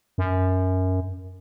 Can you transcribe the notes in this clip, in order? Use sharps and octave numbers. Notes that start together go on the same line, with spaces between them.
F#2